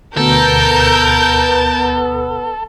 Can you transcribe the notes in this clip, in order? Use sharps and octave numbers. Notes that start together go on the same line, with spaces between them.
D2 B2 B3 A4 A#4 G6